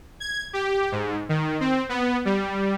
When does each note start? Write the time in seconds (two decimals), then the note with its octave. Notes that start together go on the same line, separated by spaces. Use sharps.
0.20 G#6
0.53 G4
0.92 G#2
1.29 D#3
1.60 C4
1.89 B3
2.25 G3